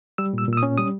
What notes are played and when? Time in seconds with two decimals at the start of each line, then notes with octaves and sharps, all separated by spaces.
0.18 G3 E6
0.34 A#2 E6
0.48 A#2 E6
0.57 D#6
0.63 C#4
0.78 G3 D#6